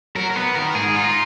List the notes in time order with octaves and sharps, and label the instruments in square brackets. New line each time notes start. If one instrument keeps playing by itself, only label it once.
[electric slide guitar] F#3 [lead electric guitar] A#4
[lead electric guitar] A#4
[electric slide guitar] B3 [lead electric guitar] B4
[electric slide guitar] D#3 [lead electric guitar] A#4
[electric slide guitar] G#2 [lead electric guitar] G#4
[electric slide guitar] D#4 [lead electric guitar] F4